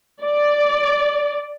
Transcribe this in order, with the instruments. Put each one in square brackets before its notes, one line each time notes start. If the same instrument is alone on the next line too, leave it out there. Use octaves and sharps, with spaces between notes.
[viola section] D5